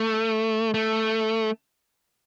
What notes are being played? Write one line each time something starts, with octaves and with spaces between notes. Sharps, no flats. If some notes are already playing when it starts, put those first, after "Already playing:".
Already playing: A3
A3